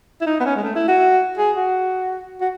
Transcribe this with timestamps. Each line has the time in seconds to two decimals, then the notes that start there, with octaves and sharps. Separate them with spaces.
0.21 E4
0.26 D#4
0.40 B3
0.45 C#4
0.56 G#3
0.63 A3
0.76 E4
0.88 F#4
1.38 G#4
1.56 F#4
2.41 F#4